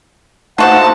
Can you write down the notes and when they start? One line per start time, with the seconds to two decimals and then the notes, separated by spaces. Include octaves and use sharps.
0.58 A3 D#4 F4 F#4 C5 F#5 A5